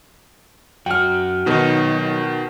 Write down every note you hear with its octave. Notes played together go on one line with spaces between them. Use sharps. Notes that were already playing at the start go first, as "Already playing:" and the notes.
F#2 F#4 G5 F6
B2 D#3 F#3 D#4